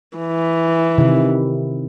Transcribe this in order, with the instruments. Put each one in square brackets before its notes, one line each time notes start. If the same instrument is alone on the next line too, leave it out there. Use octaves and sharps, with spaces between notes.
[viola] E3
[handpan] C3 D#3 E4